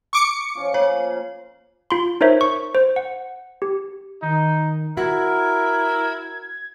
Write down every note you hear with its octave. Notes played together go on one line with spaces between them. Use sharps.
C#6 D6 C#7
F3 C#4 F4
A#3 C#5 G#5
F4 B5 C6
D#4 A#4 C5 C#5 E5
C#6
C5
F#5
G4
D#3 D#4
E4 F#4 A#4 G#6